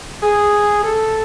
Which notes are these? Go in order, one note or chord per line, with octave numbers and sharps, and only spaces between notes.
G#4
A4